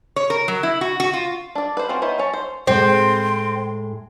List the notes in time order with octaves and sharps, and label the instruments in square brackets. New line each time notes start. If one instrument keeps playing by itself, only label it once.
[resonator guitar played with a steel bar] C#5
A#4
F#3
E4
F#4
F#4
F4
[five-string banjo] D4 D5
B4 C5
C4 C#4 F4 F#4
B3 D#4 E4 C5 C#5
C#4 C#5 A5
C5
[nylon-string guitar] A2 G#3 [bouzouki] C4 [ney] C6